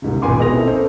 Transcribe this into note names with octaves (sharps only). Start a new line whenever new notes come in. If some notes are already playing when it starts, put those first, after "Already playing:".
C2 G#2 C#3
G#1 A#2 B4 G#5 C6 D6
B2 G#4 B4 D#6 A#6 F7
B3 C4 E4 A4
B3 C#4 D#4 A4 A#4 C5